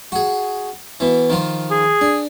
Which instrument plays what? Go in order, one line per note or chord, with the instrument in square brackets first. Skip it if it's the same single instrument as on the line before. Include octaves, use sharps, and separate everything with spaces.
[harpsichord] F#4 G#4
B2 E3
D#3 F3 F4
[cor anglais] G#4
[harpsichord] D4